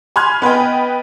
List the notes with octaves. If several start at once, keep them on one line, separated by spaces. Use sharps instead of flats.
G#5 B5 C6 F6 F#6 G#6
B3 B4 D#5 G5